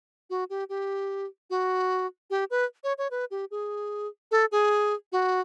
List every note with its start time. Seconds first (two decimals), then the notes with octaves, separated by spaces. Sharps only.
0.30 F#4
0.50 G4
0.69 G4
1.50 F#4
2.30 G4
2.51 B4
2.84 C#5
2.98 C#5
3.11 B4
3.31 G4
3.51 G#4
4.31 A4
4.52 G#4
5.12 F#4